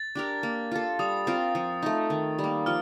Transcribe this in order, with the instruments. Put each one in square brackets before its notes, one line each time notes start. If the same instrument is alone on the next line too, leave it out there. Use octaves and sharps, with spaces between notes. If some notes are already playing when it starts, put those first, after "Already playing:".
Already playing: [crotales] A6
[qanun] D4 G4 A#4
A#3
F4 A4
[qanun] G3 [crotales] D#6
[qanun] C4 F4 A#4
F3
A3 D#4
D#3
G3
A#3
[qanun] F3 [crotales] F6